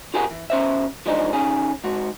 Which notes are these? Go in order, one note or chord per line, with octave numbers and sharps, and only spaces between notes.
F4 G4 G#4 A#4 E5 F#5
E3
E2 C#4 C5 E5
E3 F3 G#3 D4 D#4
D#3 C#4 G#4
G#2 F#4